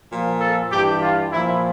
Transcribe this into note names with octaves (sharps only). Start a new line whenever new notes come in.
A#2 F3
A4
G2 E3 G4
F4
A#2 F3 E4